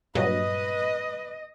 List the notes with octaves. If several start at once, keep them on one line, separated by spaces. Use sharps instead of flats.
G2 A#2 F#3 B4 D#5